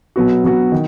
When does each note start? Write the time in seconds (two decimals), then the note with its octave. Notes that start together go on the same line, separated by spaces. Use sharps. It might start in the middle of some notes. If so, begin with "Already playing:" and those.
0.16 B2 F#3 B3 F#4
0.44 B2 F#3 B3 F#4
0.72 D#3